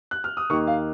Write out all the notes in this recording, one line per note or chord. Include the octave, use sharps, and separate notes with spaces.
F#6
F6
D#6
D#2 D#3 A#3 D#4 C#6
F5